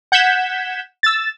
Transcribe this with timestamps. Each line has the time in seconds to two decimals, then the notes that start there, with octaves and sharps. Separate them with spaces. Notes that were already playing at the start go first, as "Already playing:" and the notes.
0.12 F#5 G6 G#6 B6 E7
1.03 E6 A6